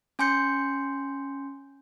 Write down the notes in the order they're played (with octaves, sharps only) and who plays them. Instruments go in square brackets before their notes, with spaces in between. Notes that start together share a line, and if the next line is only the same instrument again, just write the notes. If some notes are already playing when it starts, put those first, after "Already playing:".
[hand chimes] C#4 G#5 C6 G6 C#7